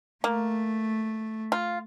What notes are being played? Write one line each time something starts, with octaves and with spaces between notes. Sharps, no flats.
A3 A#3
F4